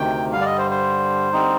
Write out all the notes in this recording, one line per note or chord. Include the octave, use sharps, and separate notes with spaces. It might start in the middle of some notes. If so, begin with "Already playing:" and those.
Already playing: D2 C3 D#3 G5
G2 D3 G3 F5
D5
D#5
C5
C5
D3 G3 C4 D#4